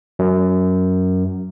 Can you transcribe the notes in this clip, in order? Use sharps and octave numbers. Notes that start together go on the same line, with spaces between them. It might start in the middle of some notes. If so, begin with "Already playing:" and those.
F#2